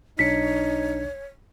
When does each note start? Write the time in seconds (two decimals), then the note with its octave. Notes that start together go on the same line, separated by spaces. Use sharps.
0.19 B1 D4 D#4 C#5 B6 C#7